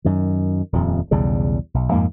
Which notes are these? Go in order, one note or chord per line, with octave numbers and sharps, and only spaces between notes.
F#2 D#3
D#1 F2
B1 E2 C#3 G3
B1
F2 G#2 A#3